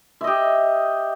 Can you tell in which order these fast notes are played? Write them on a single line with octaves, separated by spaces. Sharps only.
E5 D#5 G4